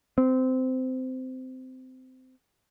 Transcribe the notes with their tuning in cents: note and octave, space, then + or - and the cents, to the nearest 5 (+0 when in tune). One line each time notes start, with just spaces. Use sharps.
C4 -20